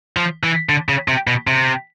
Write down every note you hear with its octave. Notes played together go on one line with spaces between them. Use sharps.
F3
E3
D3
C#3
C3
B2
C3